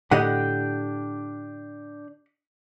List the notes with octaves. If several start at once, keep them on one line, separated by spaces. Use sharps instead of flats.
A2 D3 D4 G4 D#5 F#5 G5